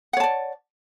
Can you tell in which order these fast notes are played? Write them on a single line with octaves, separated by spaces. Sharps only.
F#5 C#5 A5 D5